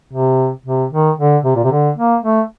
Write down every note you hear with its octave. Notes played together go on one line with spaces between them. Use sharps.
C3
C3
D#3
D3
C3
A#2
C3
D3
A#3
A3